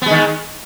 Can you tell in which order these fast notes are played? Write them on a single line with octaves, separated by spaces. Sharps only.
B3 G#3 D#3